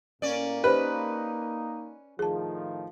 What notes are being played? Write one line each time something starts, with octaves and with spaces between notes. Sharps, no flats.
A2 A#3 C#4 D5
A#3 D#4 G4 B4 C5
A2 D#3 F3 G#4 A5